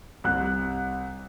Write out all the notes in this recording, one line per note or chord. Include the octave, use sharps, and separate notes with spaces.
C2 F#6